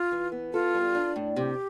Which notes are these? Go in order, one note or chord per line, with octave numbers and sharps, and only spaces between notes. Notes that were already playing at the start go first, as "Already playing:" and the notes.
Already playing: F4
E3
B3
F4 A4
G3
D4
A2
C3 G4